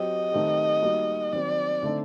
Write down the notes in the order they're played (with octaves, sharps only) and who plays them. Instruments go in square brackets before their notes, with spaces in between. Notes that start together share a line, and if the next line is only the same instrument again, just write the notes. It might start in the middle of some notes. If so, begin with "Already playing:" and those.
Already playing: [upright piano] F#3 C4 G4 [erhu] D#5
[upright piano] D#3 A3 C4 G4
G3 A#3 D#4 F#4
[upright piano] D#3 F#3 C4 [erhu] D5
[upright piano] D3 A3 C4 D#4 A4